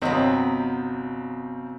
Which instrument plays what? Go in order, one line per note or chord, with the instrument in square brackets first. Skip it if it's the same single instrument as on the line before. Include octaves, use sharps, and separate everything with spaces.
[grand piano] G1 C4 D#5 [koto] C3 F#3 B3